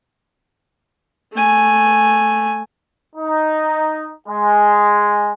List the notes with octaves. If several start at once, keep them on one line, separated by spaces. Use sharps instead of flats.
A3 G#5
D#4
G#3